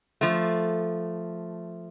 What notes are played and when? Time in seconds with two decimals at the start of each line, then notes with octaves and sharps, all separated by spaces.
0.21 F3 A3